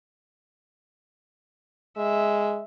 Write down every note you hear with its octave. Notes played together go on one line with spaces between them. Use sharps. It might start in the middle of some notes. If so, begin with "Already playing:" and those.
G#3 E5